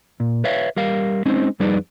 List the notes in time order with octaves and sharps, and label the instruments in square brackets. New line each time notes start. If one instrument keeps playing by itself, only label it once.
[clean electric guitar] A#2
B4 C#5 E5 F5
G3 A#4 F5
G#3 C4 C#4 D#4 C5
F2 G3 D#4 G#4 B4 D5